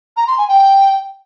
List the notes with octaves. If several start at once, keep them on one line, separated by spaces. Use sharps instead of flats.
A#5
C6
G#5
G5